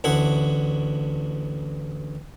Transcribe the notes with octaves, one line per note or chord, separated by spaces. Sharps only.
A1 D2 E4 F#5